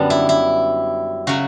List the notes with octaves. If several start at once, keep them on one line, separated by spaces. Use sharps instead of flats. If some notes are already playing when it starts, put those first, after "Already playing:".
Already playing: F#2 D3 G3 B3 D4
E4
E4
C#3 F#3 F#4